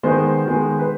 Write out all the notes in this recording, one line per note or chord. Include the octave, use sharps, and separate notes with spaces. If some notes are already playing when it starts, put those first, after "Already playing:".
D#3 G#3 B3 C5
D#3 G#3 B3
B4